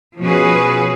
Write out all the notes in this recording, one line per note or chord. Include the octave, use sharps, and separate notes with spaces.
B2 F3 C#4 F#4 G#4 B4